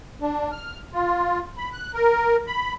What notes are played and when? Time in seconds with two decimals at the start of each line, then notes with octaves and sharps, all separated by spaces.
0.21 D4
0.52 F6
0.93 F4
1.58 B5
1.72 F#6
1.94 A#4
2.47 B5